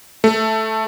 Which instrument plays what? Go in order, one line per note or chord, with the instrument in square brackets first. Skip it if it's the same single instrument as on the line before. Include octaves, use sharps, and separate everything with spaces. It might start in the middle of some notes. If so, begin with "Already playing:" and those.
[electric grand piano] A3